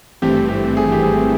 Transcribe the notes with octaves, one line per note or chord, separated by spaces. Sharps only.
G#1 G2 E3 A3 C4 G4
G4
G#4
G4
G#4